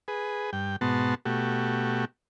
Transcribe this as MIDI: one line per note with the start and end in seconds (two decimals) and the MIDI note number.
0.08 0.50 68
0.08 0.50 71
0.53 0.76 43
0.53 0.76 79
0.81 1.15 44
0.81 1.15 47
0.81 1.15 59
0.81 1.15 66
0.81 1.15 81
0.81 1.15 84
1.25 2.05 47
1.25 2.05 57
1.25 2.05 66
1.25 2.05 67